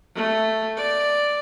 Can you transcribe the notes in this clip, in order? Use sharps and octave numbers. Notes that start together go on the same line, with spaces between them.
A3
D5